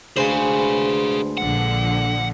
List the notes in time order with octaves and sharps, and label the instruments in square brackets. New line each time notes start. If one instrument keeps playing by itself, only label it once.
[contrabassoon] D2 [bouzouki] G#3 B4 C5 [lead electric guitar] G#4 F5
[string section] A#1 D3 F3 [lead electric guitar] F#5